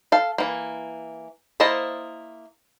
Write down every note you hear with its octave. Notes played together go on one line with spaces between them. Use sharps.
A4 F5
E3 A#3
A#3 E4 C5 D#5 A5